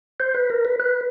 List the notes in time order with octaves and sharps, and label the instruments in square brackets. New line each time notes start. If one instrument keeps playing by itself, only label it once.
[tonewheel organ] C5
B4
A#4
B4
B4